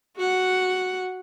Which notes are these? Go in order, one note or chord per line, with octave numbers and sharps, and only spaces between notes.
F#4 F#5